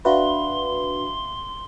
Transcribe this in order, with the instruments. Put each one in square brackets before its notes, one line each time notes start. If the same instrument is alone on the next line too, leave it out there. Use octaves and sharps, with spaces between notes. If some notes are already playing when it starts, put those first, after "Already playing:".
[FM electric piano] D4 F#4 B4 [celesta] E5 F5 [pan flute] C6